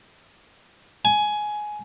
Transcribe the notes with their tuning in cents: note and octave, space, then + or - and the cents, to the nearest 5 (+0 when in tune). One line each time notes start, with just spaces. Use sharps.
G#5 +15